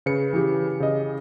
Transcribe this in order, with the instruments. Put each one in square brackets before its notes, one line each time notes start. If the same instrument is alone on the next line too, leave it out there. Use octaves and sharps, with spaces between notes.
[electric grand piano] C#3 B4 C#7
[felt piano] E3 G4
[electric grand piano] C#3 D#5